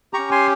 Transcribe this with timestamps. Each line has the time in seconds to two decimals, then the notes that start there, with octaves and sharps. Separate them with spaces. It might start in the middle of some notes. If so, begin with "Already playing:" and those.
0.14 C#4 G4 A#5 C#6
0.31 G#5 C6